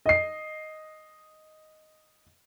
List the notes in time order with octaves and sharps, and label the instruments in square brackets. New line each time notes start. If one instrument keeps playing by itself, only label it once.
[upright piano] D#5 C7